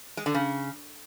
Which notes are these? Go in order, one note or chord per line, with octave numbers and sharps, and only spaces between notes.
G#3
D3
C#3